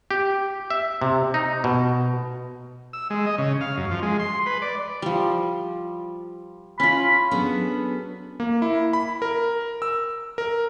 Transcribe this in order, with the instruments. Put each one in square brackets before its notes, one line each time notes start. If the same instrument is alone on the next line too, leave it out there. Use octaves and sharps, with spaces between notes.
[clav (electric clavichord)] G4
E5
C3
D#4
B2
[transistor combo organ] E6
G#3
D#5
C#3
F5
F#2
F3
G#3
C6
B4
D5
[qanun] F3 G3
[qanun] C#4 F4 [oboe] B5
[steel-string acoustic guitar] F#3 B3 C#4 D4 G#4 A4
[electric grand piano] A#3
E4
B5
A#4
E6
A#4